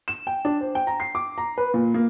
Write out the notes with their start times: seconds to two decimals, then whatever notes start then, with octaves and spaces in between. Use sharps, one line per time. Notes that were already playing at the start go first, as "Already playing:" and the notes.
0.08 E7
0.27 G5
0.45 D4
0.61 C5
0.75 G5
0.87 A#5
1.00 C7
1.15 D6
1.38 A#5
1.58 B4
1.74 A#2
1.94 A#3